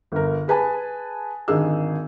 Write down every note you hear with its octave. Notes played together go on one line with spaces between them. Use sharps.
G1 A#4
G#4 B4 G#5 A5
G#1 D3 D#4 G#4 E6